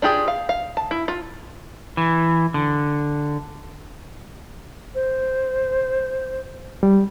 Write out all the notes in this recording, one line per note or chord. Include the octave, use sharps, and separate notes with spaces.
D4 F4 G4 G#4
F5
F5
A5
E4
F4
E3
D3
C5
G3